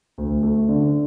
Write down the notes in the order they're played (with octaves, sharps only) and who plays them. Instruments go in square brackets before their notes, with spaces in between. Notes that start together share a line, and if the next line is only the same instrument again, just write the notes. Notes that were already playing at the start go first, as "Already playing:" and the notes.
[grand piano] D2
A3
D3